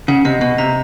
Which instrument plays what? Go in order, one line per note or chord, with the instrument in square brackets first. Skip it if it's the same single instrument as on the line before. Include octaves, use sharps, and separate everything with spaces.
[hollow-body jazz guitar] C#3 [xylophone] F#5
[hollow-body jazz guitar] C3 [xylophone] D#5
[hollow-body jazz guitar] B2 [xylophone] D#5
[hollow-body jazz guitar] C3 [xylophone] A#5